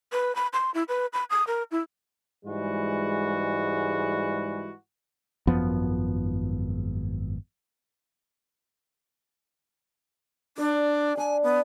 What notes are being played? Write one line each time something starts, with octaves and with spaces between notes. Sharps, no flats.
B4
B5
C6
E4
B4
B5
D#6
A#4
E4
G#2 E3 G3 G#3 F#4
G#1 F#2 F3 B3
D4 D5
D4 G#5
B3